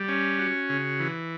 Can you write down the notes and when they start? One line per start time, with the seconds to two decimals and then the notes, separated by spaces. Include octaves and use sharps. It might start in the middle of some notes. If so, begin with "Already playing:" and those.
Already playing: G3
0.08 C#4
0.39 F#4
0.69 C#3
1.00 E3